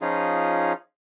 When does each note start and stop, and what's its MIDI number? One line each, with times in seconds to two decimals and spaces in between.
0.02 0.73 53
0.02 0.73 61
0.02 0.73 63
0.02 0.73 65
0.02 0.73 68